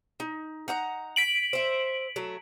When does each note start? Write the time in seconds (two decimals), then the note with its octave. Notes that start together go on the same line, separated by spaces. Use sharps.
0.20 D#4
0.68 D#4 F#5 A#5
1.16 B6 D7 F#7
1.53 C5 E5
2.16 F#3 A3